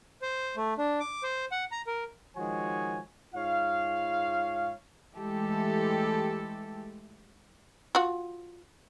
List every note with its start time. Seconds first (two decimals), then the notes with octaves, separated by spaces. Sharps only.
0.22 C5
0.56 A3
0.78 D4
1.00 D6
1.23 C5
1.52 F#5
1.72 A#5
1.87 A#4
2.36 D#3 F3 G#3 F#4 C#5 G#5
3.35 G#2 F4 C#5 F5
5.14 E3 G#3 A3 G4 A4
7.95 F4 F#4